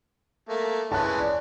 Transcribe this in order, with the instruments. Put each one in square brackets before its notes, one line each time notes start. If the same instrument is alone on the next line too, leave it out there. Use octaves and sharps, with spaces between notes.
[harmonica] A3 A#3
[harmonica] E3 G#3 C#4 [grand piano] A5 F#6
[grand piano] D5